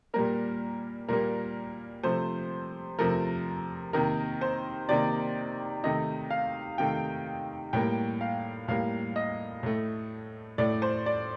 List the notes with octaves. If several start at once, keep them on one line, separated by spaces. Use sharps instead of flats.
A#2 G3 A#3 A#4
A#2 G3 A#3 A#4
C3 F3 A3 C5
C3 F3 A3 A#4
C3 D#3 A#3 A#4
C5
C3 D#3 A#3 D5
C3 D#3 A3 D#5
F5
C3 D#3 A3 G5
A2 G3 A#3 G5
F5
A2 G3 A#3 F5
D#5
A2 A3
A2 A3 D5
C5
D5